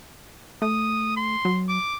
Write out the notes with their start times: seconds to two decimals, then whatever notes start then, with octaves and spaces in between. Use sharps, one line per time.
0.62 A3 D#6
1.17 C6
1.45 F#3
1.69 D6